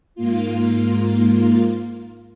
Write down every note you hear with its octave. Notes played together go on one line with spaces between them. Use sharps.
G#2 A#3 F4